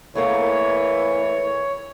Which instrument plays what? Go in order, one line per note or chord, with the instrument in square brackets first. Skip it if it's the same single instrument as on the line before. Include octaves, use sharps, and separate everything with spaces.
[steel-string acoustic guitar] E2 A3 A#3 [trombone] E3 [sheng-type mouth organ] C#5